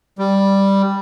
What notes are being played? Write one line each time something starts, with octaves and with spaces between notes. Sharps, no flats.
G3